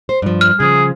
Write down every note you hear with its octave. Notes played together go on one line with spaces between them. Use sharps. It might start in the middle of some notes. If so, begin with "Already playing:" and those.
C5
G2 F3
F6
C#3 F3 G#4